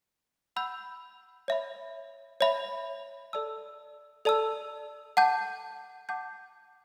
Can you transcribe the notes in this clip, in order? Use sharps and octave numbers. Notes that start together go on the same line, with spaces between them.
F#5 B5 E6 G6
C#5 E5 B5
C#5 E5 B5
A4 D5 A5 E6
A4 D5 A5 E6
F#5 A5 D6 G6
F#5 A5 D6 G6